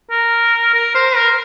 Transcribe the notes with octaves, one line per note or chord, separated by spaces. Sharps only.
A#4
A#4
C5
A#4